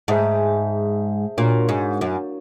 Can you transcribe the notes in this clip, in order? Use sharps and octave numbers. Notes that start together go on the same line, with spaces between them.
G#2 G#4 C5 E5 A5
A#2 D4 F#4 A#4 C#5 F5
G#2
F#2